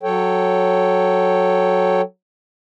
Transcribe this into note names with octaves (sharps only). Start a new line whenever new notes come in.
F#3 A4 C#5 G5